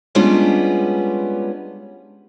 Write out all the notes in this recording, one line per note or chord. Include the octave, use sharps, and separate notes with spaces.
G3 G#3 B3 C#4 D4 F4